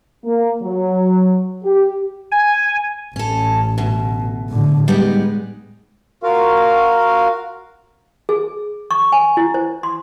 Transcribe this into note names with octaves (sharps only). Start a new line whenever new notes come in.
A#3
F#3
G4
G#5
A1 C#4 A4
D2 B2
A2 D3
G3 G#3 B3 D#4
F4 F#4 A#4 F5
G#4
C#6
G#5
E4
C5
C6